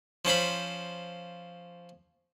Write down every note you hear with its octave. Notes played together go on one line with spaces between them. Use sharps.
F3 C#4 C5 B5